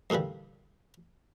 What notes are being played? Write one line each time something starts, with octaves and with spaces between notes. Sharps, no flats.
G2 A#2 D3 E3 G3